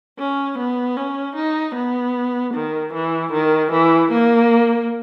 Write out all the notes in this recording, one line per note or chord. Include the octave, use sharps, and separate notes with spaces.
C#4
B3
C#4
D#4
B3
D#3
E3
D#3
E3
A#3